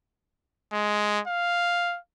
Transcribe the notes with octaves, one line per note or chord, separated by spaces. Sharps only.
G#3
F5